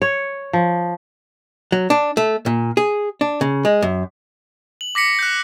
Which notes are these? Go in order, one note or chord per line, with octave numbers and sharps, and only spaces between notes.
C#5
F3
F#3
D4
A3
A#2
G#4
D4
C#3
G#3
F#2
F#7
D6 A#6 B6 C#7
F#6 G6